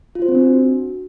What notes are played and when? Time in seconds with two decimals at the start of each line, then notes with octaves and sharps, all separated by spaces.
0.15 F4
0.22 C5
0.28 C4
0.35 D4
0.41 F#4